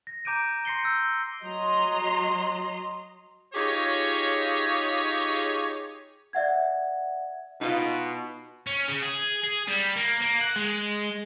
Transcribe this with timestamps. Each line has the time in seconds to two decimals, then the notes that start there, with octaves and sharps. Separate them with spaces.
0.07 A#6
0.25 A#5 D6 G6 D7 D#7
0.65 C6 A#6 C7 C#7 G7
0.83 E6 G6
1.44 F#3 D#5 A#5 C6
3.54 D#4 F4 G4 G#4 C#5
6.33 D5 E5 F#5 G#6
7.61 B2 D#4 F4
8.67 C#4
8.88 C#3
9.02 G#4
9.44 G#4
9.68 G3
9.97 A#3
10.22 A#3
10.41 F#5
10.56 G#3